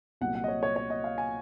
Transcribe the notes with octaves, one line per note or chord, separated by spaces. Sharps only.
C2 A#2 F#3 F#5
F#5
D#5
C#5
C#5
C#5
D#5
F5
G#5